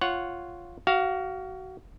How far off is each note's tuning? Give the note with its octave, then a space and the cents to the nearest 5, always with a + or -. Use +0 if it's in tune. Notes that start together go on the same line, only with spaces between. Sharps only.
F4 +0 C#5 +0 F#5 +0
F#4 +25 F5 +0